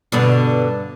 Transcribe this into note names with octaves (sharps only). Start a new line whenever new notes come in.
G2 B2 D3